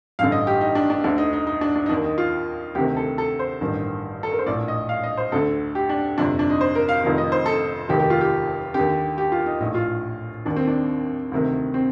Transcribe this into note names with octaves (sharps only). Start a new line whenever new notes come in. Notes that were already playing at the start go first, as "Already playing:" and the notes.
A1 G2 D3 F5
D#5
G4
D#4
D4
D4
D2 D3 D4
D#4
D#4
D#4
D4
D4
D#4
D#2 D#3 D4
D#4
F4
D2 C3 D#3 G4
A4
A4
C5
A1 G2 D#3
A4
A#4
C5
A#1 A2 D5
D#5
F5
D#5
C5
D2 D3 A4
G4
D4
G1 F2 C3 D4
D4
D#4
C5
A#4
F5
F1 F2 C3 D#3 F5
D#5
C5
A4
F1 D#2 D#3 G4
G4
F4
G4
D3 G4
D#2
G4
F4
D#4
A#1 A2 D#4
F4
D#2 D#3 D4
C4
D4
D2 C3 D#3
C4